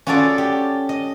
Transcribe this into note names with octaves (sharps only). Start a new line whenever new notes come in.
C#4 F4 F#4 G#4 A4 D5
G4
D#5